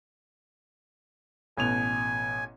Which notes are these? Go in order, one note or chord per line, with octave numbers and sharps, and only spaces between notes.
A1 B2 G#5 F7